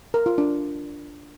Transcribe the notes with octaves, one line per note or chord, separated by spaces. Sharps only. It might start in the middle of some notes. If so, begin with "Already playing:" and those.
A#4
F4
D4